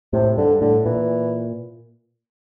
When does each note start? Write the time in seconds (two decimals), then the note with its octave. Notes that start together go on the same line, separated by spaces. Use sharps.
0.13 A2 C3
0.37 G2 D3
0.61 A2 D3
0.85 A#2 E3